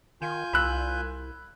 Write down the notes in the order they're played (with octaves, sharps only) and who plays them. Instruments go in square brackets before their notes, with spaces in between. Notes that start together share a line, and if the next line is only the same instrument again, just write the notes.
[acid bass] D#3 [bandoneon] F4 G#5 G6
[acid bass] C2 [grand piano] B5 E6 F#6